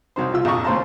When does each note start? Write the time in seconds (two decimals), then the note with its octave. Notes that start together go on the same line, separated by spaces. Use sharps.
0.16 C2 F#3 D#4 C5
0.33 C2 F3 F4 E6
0.45 A#1 F2 D#5 A5 C#6
0.64 D#2 C#3 C5 F5 A5 A#5